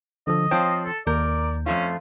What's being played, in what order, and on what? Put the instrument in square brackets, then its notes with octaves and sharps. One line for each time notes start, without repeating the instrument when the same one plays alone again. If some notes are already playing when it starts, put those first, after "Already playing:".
[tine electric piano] D3 F3 A4 [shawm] D#5
[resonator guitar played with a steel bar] F3 C4 [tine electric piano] C#5 G5 A5
[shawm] A4
[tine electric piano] D#2 G6 [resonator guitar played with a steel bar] A#4 [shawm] D5
[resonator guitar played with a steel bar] F2 A3 F4 [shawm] C#4